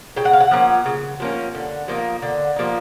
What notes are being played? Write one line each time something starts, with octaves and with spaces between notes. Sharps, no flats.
C#3 G5
F#5
F5
F#5
F3 A#3 C#4
C#3
F3 A#3 C#4
D3
F3 A#3 D#4
D3
F3 A#3 D#4